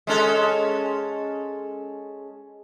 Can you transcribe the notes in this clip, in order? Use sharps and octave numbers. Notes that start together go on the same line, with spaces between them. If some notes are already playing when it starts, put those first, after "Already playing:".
G#3 C#4 A4